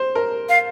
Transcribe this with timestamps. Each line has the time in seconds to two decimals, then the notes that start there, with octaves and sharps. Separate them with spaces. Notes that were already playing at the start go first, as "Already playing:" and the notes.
Already playing: C5
0.15 A#4
0.49 F5